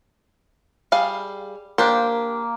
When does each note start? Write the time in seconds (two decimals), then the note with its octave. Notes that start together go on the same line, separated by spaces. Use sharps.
0.92 G3 G#4 F5
1.78 A#3 D4 G4 C5